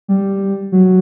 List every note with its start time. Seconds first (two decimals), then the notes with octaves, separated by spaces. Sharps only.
0.08 G3
0.72 F#3